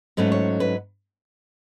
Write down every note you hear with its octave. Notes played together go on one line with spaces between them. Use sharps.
G#2 F#3 A3 C#4 B4
C#5
B4